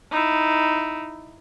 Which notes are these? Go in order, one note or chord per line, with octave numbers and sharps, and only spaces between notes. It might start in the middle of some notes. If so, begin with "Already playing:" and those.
D#4 E4